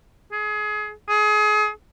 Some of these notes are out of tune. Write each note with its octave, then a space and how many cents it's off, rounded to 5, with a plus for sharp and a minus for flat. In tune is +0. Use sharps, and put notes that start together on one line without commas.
G#4 +25
G#4 +30